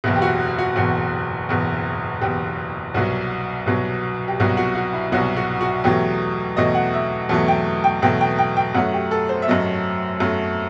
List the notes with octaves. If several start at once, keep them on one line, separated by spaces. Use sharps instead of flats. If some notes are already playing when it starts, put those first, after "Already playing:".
F#1 E2 B2 E4
G4
F#4
F#4
F#1 E2 B2 F#4
F#1 E2 B2
F#1 E2 B2 G4
C2 B2 F#3 F#4
C2 B2 F#3
G4
C2 B2 F#3 F#4
F#4
F#4
E4
C2 B2 F#3 F#4
F#4
F#4
E2 B2 F#3 A3 G4
E2 B2 F#3 A3 D#5
F#5
E5
E2 B2 F#3 A3 A5
G5
G5
E2 B2 F#3 A3 G5
G5
G5
G5
F#2 F#3 A3 F#5
G4
A4
C5
E5
F#2 F#3 A3 D#5
F#2 F#3 A3